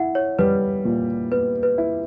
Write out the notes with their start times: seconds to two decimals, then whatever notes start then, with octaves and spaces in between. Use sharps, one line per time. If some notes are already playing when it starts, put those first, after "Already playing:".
Already playing: E4 F#5
0.15 C#5
0.39 G3 B4
0.85 A#2
1.32 B3 B4
1.63 B4
1.78 E4